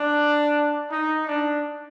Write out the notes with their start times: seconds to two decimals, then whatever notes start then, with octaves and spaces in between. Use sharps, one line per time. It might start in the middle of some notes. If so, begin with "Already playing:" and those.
Already playing: D4
0.90 D#4
1.28 D4